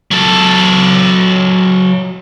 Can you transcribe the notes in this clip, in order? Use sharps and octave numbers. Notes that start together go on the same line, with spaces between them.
F#3 A4